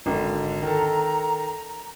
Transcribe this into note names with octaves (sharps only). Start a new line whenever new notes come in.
G#1 G#2 D3 A#5
D#3 A4